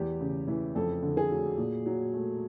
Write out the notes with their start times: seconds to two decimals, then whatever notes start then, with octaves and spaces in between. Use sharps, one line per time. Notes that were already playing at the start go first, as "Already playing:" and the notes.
Already playing: E2 G4
0.20 C#3
0.48 E3
0.75 F2 A4
1.03 D3
1.17 G#4
1.31 F#3
1.57 A#2
1.86 F#3
2.14 A3